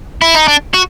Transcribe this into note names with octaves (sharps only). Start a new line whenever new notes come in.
E4
D#4
D4
F#4